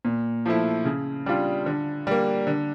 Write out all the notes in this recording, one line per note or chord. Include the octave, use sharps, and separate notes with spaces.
A#2
F3 A3 E4
C#3
G3 D4 F4
D3
G3 A#3
D3